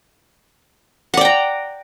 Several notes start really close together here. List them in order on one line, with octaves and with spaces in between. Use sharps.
F#5 D5 G5 A#5